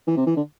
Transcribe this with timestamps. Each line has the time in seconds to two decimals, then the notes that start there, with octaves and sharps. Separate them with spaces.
0.07 E3
0.17 C3
0.26 E3
0.36 D3